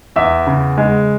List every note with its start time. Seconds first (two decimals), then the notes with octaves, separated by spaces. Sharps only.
0.16 E2 E5
0.47 C#3
0.77 G#3